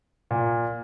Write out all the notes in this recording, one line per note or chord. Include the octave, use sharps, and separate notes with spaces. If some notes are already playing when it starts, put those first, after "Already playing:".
A#2